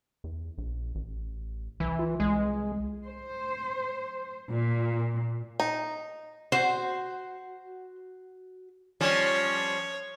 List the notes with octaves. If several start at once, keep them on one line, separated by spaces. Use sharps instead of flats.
E2
A#1
A1
C2 E3
F4
C2 G#3
C5
A#2
D#4
F#4 C5
F3 G3 C#4 C#5